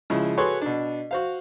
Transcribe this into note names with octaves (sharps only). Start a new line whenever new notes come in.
C#3 F3 G#3 E4
F#4 G#4 A4 B4 C#5 C6
B2 D4
F#4 C5 F5